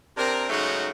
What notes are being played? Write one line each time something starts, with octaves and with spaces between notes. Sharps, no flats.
C3 C4 D4 A#4
G#2 C#3 F#3 A3 D#4 F#4